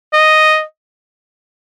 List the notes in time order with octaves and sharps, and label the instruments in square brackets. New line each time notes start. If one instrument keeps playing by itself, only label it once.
[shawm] D#5